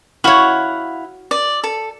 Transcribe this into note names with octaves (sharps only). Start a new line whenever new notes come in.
E4 F#4 C#5 F5 F#5
D5
A4